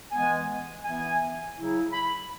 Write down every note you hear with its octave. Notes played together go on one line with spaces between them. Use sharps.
E3 G#3 B3 G#5
E3 B3 E4 G#5
C#3 F#3 E4
B5